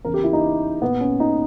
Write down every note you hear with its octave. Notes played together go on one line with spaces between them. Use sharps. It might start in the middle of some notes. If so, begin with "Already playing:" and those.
E2 C#3 E3 A#4
G4
E4
D#4
A#2 B3
C#4
D#4